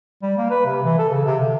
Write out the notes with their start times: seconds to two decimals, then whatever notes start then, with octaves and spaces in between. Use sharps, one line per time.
0.22 G3
0.38 A#3
0.50 B4
0.65 C3
0.84 E3
0.98 A4
1.10 C#3
1.25 C3
1.40 D3